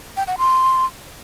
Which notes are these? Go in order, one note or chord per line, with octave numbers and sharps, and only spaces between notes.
G5
F#5
C6